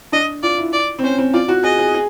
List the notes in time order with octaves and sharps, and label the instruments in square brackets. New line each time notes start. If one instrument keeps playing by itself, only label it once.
[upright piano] D4 [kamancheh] D#5
[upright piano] F4 [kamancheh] D5
[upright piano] E4
[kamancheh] D5
[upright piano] C4
[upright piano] C#4 [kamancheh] C5
[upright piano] C4
[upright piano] F4 [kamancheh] D5
[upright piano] F#4
[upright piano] G#4 [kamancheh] D#5
[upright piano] G#4
G#4